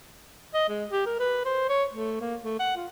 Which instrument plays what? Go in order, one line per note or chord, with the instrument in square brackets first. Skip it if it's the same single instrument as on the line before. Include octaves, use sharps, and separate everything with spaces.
[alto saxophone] D#5
G#3
G4
A#4
B4
C5
C#5
A3
A#3
A3
F#5
F4